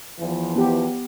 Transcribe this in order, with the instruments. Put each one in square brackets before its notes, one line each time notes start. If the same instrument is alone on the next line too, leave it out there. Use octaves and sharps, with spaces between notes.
[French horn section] E2 E3 F3
[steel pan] B3 G4